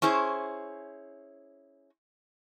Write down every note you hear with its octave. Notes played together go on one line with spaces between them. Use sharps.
C#4 E4 G#4 C5